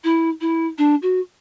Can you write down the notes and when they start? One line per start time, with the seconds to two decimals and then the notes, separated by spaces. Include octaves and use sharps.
0.04 E4
0.41 E4
0.78 D4
1.02 F#4